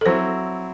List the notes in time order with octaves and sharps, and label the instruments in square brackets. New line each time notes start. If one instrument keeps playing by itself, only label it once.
[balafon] A4
[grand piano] F#3 C4 E4 [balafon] C5